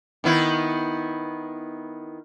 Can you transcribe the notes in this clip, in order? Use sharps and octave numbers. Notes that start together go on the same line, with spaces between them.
D#3 B3 E4